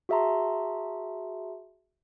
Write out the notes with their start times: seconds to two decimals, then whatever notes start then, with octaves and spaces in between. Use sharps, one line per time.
0.09 F#4 G#4 E5 A5 A#5 C6